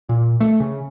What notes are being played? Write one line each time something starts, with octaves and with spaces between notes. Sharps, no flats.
A#2
A3
C#3